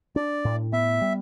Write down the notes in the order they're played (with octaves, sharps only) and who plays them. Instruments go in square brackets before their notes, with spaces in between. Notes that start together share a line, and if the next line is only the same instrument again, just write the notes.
[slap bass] D4 [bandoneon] D5
[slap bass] A2
[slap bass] B3 [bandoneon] E5
[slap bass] G3